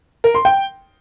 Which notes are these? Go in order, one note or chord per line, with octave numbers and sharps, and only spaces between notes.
A#4
C6
G5